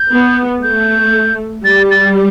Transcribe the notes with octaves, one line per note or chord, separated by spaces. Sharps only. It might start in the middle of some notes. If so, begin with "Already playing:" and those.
Already playing: G6
B3
A3 G6
G3 A6
A6